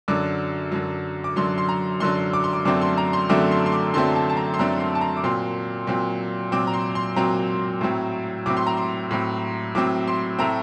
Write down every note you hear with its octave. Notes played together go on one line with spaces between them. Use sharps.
F#2 D3 F#3 D6
F#2 D3 F#3
D6
F#2 D3 F#3 C6
C6
A#5
F#2 D3 F#3 C6
D6
C6
D6
F#2 D3 F#3 A3 C4 D6
C6
A#5
C6
F#2 D3 F#3 A3 C4 D6
C6
C6
D6
F#2 D3 F#3 A3 C4 C6
A5
A5
A#5
C6
F#2 D3 F#3 A3 C4 A#5
C6
A5
A#5
D6
A#2 F#3 C4 C6
A#2 F#3 C4
A#2 F#3 C4 D6
A#5
C6
C6
A#2 F#3 C4 A#5
A2 F#3 C4
A2 F#3 C4 D6
C6
A#5
C6
A2 F#3 C4
A2 F#3 C4 D6
C6
A2 A3 C4 A#5